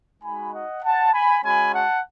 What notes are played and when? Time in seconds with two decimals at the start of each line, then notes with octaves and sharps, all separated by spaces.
0.23 G#3 D#4 F#4 G#5 B5
0.53 D#5 F#5
0.83 F#5 A5
1.13 G#5 B5
1.43 G#3 C#4 F#4 G#5 B5
1.73 F#5 A5